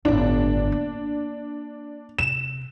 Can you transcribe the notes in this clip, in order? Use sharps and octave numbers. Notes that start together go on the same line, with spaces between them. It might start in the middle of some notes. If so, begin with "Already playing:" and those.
G1 A2 D4
A#3
C3 E7